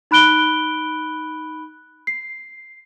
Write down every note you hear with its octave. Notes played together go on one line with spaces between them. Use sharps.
D#4 B5 F#6 D7 G7
C7